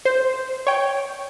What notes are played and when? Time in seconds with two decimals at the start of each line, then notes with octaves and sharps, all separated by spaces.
0.05 C5
0.67 C#5 G5